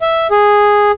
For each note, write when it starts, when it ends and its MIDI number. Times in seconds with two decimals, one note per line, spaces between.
0.02 0.27 76
0.31 0.92 68